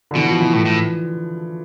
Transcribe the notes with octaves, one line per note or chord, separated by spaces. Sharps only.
D3
B2 E3
F3
E3
A2
A2